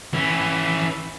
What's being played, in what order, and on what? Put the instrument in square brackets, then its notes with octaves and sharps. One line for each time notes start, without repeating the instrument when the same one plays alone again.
[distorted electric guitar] E3 C#4